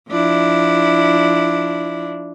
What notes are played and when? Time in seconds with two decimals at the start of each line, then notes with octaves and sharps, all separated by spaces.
0.10 F3 D4 E4